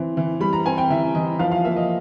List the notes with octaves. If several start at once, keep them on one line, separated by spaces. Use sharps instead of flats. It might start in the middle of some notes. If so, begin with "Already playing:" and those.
Already playing: E3 C4
E3
G3 B5
A#5
C4 G#5
G5
E3 E5
E3 D#5
F3 F5
F5
A#3 E5
D#5